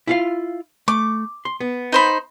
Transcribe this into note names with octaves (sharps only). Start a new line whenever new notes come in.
E4 F4 F5
A3 D6
C6
B3
D#4 C5 B5